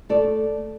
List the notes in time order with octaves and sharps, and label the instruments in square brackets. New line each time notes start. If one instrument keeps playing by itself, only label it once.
[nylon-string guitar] A3 A4 D5